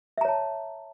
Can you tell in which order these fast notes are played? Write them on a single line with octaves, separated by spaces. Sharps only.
E5 A#5 C#5 A5